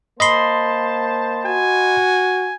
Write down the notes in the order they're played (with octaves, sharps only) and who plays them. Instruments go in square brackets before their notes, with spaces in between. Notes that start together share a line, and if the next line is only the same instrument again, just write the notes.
[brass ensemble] A#3 C5 A5 [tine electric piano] D#5 B5 C6
[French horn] F#4 [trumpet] G#5